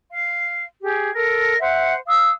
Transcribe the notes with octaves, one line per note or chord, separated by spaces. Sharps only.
F5
G4 G#4
A4 A#4
C5 E5 F#5
F5 D#6 E6